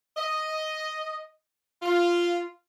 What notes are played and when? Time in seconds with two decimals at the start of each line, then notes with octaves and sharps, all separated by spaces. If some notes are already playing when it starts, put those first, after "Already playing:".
0.16 D#5
1.82 F4